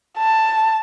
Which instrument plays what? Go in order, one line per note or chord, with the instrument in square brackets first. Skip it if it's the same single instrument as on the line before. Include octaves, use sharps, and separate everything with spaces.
[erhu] A5